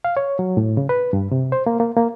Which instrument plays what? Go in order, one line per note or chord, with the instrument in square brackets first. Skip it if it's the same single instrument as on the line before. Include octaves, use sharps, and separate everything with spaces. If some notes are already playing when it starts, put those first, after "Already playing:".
[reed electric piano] F5
C#5
F#3
A2
C#3
B4
G2
C3
C5
A#3
A#3
A#3